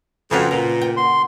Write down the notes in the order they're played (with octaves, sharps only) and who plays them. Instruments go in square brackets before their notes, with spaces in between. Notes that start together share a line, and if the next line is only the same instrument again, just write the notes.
[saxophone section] F2 [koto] C#3 F4 F#4 [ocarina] B4
[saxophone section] A#2 [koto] A#4
[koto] G5
[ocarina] F#5 [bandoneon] C6